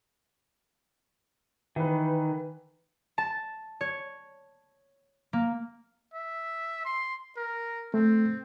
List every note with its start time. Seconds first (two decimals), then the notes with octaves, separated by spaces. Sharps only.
1.76 D#3 E3 B4
3.18 A5
3.81 C#5
5.33 A#3
6.14 E5
6.85 C6
7.37 A#4
7.94 A3 C4